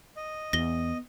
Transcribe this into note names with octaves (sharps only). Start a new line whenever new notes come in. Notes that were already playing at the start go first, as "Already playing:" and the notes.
D#5
E2 B3 A#6 G7